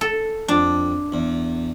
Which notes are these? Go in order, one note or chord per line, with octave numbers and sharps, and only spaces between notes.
A4
F2 D4
E2